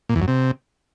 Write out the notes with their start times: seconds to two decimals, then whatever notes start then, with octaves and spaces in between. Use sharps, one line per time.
0.09 A#2
0.16 E2
0.22 F#2
0.28 C3